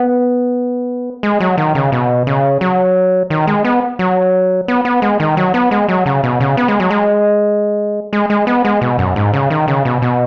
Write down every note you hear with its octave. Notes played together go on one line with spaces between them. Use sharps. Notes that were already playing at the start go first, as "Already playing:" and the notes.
Already playing: B3
G#3
F#3
D#3
C#3
B2
C#3
F#3
D#3
G#3
B3
F#3
B3
B3
G#3
D#3
F#3
B3
G#3
F#3
C#3
B2
C#3
B3
G#3
F#3
G#3
G#3
G#3
B3
G#3
B2
F#2
G#2
C#3
D#3
C#3
B2
B2